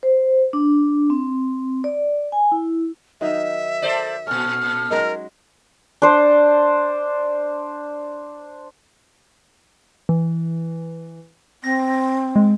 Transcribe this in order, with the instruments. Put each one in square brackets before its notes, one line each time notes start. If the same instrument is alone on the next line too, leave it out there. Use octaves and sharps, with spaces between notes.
[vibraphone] C5
D4
C4
D5
G#5
E4
[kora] D#3 F#3 D#4 [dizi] E5
[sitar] A4 C5 D5
[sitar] A#2 A4 [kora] C#4 F#4 [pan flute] F6
[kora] F#3 G#3 D#4 [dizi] A#4
[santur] D4 C5
[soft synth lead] E3
[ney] C4 [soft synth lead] A#6
[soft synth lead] G#3